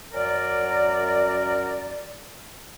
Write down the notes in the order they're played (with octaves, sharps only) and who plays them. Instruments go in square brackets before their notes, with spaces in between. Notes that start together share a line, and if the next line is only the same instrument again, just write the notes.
[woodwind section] F#2 A#4 D5